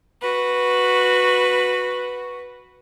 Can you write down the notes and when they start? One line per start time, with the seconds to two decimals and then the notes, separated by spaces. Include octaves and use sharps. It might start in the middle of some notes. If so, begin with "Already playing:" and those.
0.22 F#4 B4